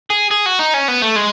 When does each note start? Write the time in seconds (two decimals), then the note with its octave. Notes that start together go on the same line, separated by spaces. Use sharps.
0.10 G#4
0.31 G#4
0.46 F#4
0.59 D#4
0.74 C#4
0.88 B3
1.02 A3
1.16 G#3